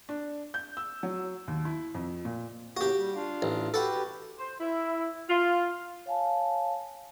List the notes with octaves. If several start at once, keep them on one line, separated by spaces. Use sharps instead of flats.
D4
G6
E6
F#3
D#2
E4
F2
A#2
A2 C#3 A#3 F#4 G4
G3
D4 F4 F5
A1
F#4 G4 A4 B4 F#5
C5
E4
F4
C#5 F5 G#5 A5